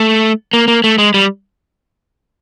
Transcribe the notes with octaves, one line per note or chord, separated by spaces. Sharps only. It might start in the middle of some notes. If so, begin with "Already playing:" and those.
Already playing: A3
A#3
A#3
A3
G#3
G3